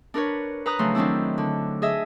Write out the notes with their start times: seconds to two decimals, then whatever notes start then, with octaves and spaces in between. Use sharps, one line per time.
0.14 D4 A#4 B4 C#5
0.66 B4 A#5 D#6 F#6
0.79 C#3 F3 F#3 A3 C5
0.95 D#3 F#3 C4 D4 E4
1.38 D3
1.82 G#4 D#5 E5